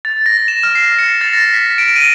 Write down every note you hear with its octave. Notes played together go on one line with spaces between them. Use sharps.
A6
A#6
E7
F6
C7
C#7
A6
A#6
B6
D7
D#7